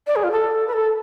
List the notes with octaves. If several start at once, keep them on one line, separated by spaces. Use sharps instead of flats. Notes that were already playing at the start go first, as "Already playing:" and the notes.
D5
G#4
F4
A4
B4
A4